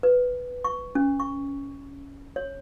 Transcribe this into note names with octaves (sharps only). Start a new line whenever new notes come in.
B4
C#6
C#4
C#6
C#5